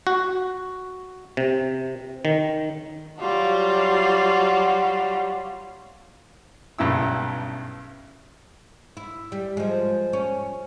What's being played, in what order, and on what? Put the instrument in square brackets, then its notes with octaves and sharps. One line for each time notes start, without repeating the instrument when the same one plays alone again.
[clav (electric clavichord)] F#4
C3
D#3
[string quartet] F#3 G3 F4 F#4
[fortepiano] B1 G2 C#3 E4 E6
[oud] E4
G3
F3 G#3
C#4